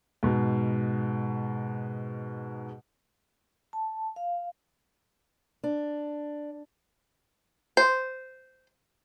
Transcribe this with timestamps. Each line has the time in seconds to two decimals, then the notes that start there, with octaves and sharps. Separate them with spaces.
0.23 G#2 B2
3.73 A5
4.16 F5
5.64 D4
7.77 C5